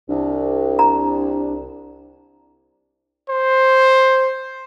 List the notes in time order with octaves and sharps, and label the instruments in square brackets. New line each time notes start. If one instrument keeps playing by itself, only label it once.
[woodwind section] C2 [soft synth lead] D4
[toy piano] A#5
[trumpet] C5